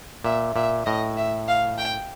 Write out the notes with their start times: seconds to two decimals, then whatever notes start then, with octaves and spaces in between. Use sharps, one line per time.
0.25 A#2 E5
0.56 A#2 E5
0.86 A2 D#5
1.17 E5
1.48 F5
1.78 G5